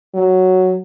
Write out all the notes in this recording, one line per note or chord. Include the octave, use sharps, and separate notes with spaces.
F#3